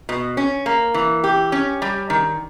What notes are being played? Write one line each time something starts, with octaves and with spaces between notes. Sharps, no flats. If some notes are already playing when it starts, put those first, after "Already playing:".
B2
C#4
A#3
E3
G4
C#4
G3
D#3